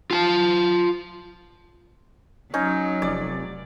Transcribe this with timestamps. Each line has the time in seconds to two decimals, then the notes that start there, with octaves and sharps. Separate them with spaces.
0.11 F4 G#5 A5
2.54 F#3 C#4 D#4
3.02 F1 D5